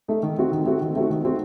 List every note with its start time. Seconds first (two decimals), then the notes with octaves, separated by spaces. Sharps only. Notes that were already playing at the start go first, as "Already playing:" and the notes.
0.08 A3 D#4 A4
0.23 D#3
0.38 A3 C4 F#4
0.52 D#3
0.66 A3 C4 F#4
0.81 D#3
0.96 A3 C4 F#4
1.10 D#3
1.25 A3 C4 F#4